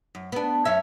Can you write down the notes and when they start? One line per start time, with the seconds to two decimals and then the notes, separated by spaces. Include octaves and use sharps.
0.15 F#2
0.32 B3 D4
0.65 F#2 C#4 E5